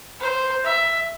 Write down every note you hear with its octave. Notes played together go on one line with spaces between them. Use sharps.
C5
E5